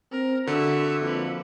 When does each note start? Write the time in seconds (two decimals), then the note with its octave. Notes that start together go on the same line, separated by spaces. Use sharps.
0.12 C4 A#4
0.47 D3 F#4 E5 C#6
1.01 F2 A#3 B4